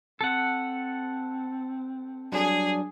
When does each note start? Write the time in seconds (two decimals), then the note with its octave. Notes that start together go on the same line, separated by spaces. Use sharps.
0.21 C4 A4 F#5
2.32 F#3 G3 D4 G#4